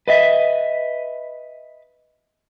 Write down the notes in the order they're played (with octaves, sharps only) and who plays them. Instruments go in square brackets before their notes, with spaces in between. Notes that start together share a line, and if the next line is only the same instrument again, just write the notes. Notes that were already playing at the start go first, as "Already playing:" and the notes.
[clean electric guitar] B4 D#5 E5